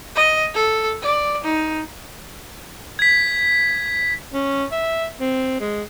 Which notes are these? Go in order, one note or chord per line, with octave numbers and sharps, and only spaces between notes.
D#5
A4
D5
D#4
G#6 B6
C#4
E5
C4
G#3